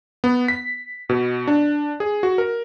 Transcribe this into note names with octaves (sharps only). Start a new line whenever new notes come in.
B3
B6
B2
D4
G#4
F#4
A#4